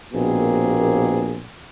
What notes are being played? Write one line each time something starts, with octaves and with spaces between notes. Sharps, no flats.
A#1 B2 A#3 C4 G#4